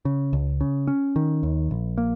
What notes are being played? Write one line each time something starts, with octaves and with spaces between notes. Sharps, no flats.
C#3
C#2
C#3
C#4
D#3
D#2
A#1
A#3